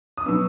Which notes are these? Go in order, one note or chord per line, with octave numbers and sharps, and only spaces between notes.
D#6
B2 F#3 B3 E6